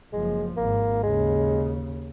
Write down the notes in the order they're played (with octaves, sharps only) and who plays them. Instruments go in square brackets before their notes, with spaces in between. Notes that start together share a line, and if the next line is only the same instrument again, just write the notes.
[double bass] F#1 F3 [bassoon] G#3
[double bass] G#1 [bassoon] A#3
[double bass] D#2 C#3 [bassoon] G#3